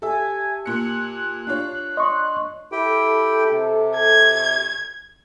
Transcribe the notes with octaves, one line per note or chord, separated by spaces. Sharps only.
G4 A4 E5 G#5 A5 E6
A#2 F#6 C#7
D4 F4 C#5
D#5 C6 C#6
E4 G4 A4 G5
C3
G#6